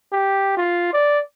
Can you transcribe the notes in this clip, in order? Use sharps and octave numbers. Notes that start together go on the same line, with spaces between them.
G4
F4
D5